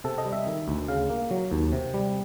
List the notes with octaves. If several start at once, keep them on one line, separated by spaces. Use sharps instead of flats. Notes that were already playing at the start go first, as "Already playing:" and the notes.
C3 A4
D#5
G3
E5
D#3
D2
C#3 F5
A#3
F#3
D#2
C3
G3